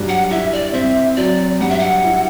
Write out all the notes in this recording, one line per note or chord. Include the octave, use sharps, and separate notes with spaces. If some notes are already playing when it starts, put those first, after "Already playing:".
Already playing: G2 F#3
F#5
E4 E5
D5
C4 E5
F#3 D5
G2 F#5
E5
F#5
E4